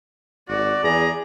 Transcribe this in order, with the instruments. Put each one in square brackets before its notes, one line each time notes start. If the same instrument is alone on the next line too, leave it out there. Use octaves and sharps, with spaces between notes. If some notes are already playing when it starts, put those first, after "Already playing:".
[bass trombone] G#1 [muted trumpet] F#4 [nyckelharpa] D5
[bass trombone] E2 [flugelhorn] G#4 [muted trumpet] A#5